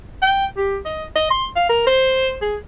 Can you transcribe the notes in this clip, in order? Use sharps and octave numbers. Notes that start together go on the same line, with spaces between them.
G5
G4
D#5
D#5
C6
F5
A#4
C5
G#4